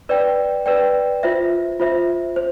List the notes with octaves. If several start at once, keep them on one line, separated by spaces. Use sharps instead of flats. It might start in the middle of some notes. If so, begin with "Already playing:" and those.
B4 D5 G5
B4 D5 G5
F4 C5 E5
F4 C5 E5
C5